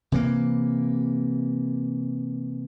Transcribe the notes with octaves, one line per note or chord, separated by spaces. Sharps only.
C3 E3 A#3